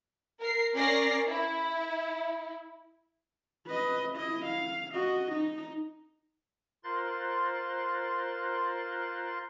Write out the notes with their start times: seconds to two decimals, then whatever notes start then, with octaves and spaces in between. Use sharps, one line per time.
0.41 A#4 C7
0.76 C#4 A#4 D5 A#6 C7
1.27 E4
3.66 B4 D#5
4.15 E4 D#5
4.45 F5
4.94 F#4 D#5
5.32 D#4
6.84 F4 A#4 C5 C6 F#6 A6